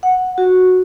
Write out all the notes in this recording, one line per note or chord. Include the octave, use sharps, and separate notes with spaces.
F#5
F#4